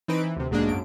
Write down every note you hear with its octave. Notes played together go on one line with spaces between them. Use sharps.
E3 C4 D#4 B4 D7
E3
D2 C3
B1 G#2 G#3 A#3 D4
F#2 D7